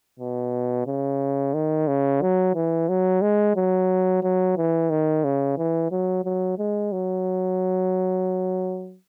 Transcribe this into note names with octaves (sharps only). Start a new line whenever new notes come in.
B2
C#3
D#3
C#3
F#3
E3
F#3
G#3
F#3
F#3
E3
D#3
C#3
E3
F#3
F#3
G#3
F#3